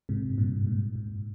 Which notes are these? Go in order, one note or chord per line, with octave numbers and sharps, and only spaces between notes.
G#2 C3
G2 A#2
G#2
G#2